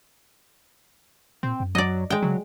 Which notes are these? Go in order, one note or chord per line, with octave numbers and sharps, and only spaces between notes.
A#2 C4
F#2
F#3 D5 D#5
G#3 G5
C#3 F#3